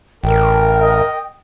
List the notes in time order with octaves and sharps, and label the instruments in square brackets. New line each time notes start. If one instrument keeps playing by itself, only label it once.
[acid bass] A1 [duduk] A#4 [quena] G5
[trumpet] D#5